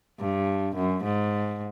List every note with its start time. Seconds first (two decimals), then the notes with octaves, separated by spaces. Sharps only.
0.20 G2
0.76 F#2
1.03 G#2